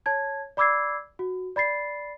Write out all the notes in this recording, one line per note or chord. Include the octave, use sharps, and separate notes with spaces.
C#5 A5 G#6
D5 B5 D6 E6 G#6 C7
F#4
D5 B5 A6 C7